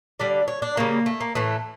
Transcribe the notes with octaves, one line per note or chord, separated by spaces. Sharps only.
D3 G3 D5
C#5
D4
C#3 G3 A#3
A3
A#3
A2 E3 A3